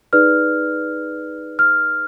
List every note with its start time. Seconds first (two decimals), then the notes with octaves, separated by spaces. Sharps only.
0.13 D#4 G#4 B4 D5 F6
1.59 F6